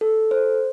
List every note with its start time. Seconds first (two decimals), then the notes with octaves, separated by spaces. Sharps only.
0.01 A4
0.31 C5